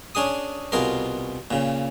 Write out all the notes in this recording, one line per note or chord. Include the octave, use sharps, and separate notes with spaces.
C#4 D4 G#4 D#6
C2 B2 F4 G#4 A#4
A#2 C#3